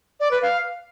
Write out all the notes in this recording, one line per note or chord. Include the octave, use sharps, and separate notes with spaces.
D5
B4
F5